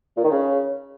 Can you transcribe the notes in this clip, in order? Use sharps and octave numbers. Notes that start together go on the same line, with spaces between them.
A#2
D#3
C#3